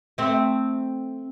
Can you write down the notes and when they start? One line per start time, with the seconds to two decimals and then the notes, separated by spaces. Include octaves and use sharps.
0.18 A3 C4